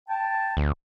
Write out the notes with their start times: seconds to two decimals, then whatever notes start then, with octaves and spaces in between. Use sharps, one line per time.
0.09 G5 A5
0.57 D2